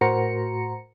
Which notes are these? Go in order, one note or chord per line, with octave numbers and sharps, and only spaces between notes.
A2 F#4 A#4 C5 A#5 C#7